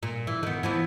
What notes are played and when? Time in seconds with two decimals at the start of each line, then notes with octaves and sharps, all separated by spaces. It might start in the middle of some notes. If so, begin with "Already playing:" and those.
0.03 A#2
0.27 E3
0.43 D#3 B3
0.63 E3 F3 B3